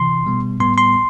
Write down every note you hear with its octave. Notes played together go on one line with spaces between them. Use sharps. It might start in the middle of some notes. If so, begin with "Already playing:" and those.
Already playing: C3 E3 C6
B2 G3 B3
A2 G3 B3 C6
C6